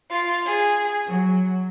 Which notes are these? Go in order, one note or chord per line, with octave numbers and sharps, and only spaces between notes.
F4
G#4
F#3